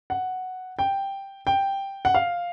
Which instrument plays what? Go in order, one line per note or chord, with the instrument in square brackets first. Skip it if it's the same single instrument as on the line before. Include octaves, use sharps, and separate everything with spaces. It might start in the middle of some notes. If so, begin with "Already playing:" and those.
[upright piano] F#5
G5
G5
F#5
F5